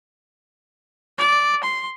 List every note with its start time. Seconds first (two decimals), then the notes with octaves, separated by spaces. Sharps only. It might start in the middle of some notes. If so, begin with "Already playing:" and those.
1.18 D5
1.64 C6